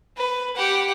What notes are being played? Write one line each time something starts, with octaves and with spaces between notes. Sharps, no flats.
B4
G4 F#5